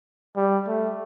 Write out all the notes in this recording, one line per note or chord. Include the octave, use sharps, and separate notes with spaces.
G3
A3